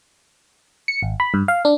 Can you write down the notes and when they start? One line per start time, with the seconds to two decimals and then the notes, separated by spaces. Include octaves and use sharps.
0.88 C#7
1.02 G#1
1.20 B5
1.34 G2
1.48 F5
1.65 D4